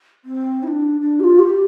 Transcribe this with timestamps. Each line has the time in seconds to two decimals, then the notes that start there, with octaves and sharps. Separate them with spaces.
0.25 C4
0.63 E4
0.67 D4
1.01 D4
1.20 G4
1.24 F4
1.39 G4